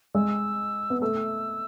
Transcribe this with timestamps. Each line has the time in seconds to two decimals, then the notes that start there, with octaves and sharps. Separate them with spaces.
0.15 G#3 E6
0.90 B3
1.02 A3 E6